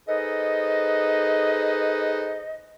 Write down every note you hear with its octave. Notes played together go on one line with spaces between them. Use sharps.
D#4 G#4 A4 B4 C5 D#5